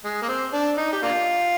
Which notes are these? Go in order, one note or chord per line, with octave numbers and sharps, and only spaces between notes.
G#3
A#3
C4
D4
D#4
G4
A#3 D4 F4